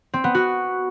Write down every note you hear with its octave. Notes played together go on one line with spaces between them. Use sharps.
C4
B3
F#4